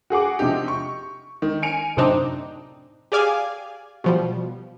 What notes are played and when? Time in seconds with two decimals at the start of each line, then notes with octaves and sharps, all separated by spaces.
0.10 F#4 G#4 F#5 D6
0.39 C3 F3 D4 D#4 G4
0.68 C#6
1.42 D#3
1.62 G#5 C#7 D7 F7
1.97 F#2 A2 C3 C4 D4 D#4
3.12 G4 G#4 D5 F5 G#5
4.04 B2 F3 G3